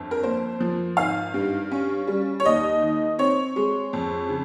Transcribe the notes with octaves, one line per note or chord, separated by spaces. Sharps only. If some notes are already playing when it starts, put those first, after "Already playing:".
Already playing: G1 F2
A#4
A#3 C5
F3
G#1 F5
G2
C#4
G3
C#5
D#2 D#5
D#3
C4 C#5
G#3
F2
C#3